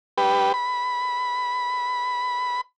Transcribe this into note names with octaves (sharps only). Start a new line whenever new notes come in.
G4 B4
B5